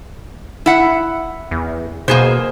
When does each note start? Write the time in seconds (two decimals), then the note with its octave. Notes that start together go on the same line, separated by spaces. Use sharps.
0.66 E4 F#5
1.51 E2
2.08 B2 A#3 G#4 C5